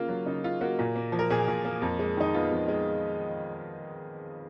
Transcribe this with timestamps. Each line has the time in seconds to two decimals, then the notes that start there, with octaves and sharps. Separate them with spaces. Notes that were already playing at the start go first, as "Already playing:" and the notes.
Already playing: C#3 A#3 F4
0.08 F#3
0.26 C#3 D#4
0.44 C#3 F4
0.61 A#3 F#4
0.79 A#2
0.96 A#3
1.12 F3
1.19 A#4
1.30 A#2 G#4
1.48 A#2
1.65 A#3
1.82 F2
1.99 G#3
2.17 D#3 D#4
2.34 B3 F4
2.51 F2
2.68 G#3